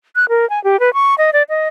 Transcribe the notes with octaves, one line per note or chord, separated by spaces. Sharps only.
F#6
A#4
G#5
G4
B4
C#6
D#5
D5
D#5